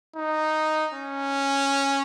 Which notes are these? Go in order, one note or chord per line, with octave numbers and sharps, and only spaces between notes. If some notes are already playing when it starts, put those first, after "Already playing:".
D#4
C#4